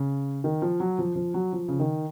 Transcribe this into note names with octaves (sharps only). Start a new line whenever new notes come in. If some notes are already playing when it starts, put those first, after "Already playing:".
Already playing: C#3
D#3
F3
F#3
F3
F3
F#3
F3
C#3
D#3